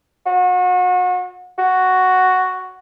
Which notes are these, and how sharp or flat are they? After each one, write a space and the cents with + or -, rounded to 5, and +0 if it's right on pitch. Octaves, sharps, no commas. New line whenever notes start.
F#4 -35
F#4 +5